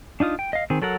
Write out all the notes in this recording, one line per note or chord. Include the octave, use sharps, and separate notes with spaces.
D4 D#4 F4 D#6
G5
D#5 F5
D#3 C4 G#4
F#3 A4 A#4 F#5